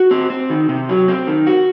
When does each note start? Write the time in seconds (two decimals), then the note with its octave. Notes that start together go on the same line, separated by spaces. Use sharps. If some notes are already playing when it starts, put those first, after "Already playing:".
Already playing: F#4
0.11 C4
0.30 C4
0.50 D#3
0.69 C3
0.89 F#3
1.08 C4
1.27 D#3
1.47 F#4